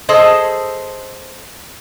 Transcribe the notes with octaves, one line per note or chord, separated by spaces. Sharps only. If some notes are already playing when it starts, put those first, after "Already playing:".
G#4 A4 C5 D#5